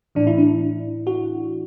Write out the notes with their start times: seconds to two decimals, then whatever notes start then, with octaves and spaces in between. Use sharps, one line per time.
0.15 A2 E3 D4
0.27 E4
0.38 D4
1.07 F#4